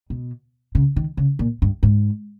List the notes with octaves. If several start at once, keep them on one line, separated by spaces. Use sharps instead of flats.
B2
C#3
D#3
C#3
A#2
G2
G#2